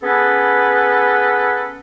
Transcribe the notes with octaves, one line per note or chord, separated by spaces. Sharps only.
B3 C#4 G#4 A4 B4